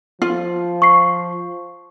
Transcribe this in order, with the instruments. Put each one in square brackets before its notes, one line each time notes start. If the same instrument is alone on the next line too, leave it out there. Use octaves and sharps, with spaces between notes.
[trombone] F3 [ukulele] F4
[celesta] C#6 C7